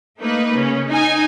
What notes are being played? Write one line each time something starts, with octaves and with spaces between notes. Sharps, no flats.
A3 A#3 D#4 B4
C#3 C#4
D#4 G#5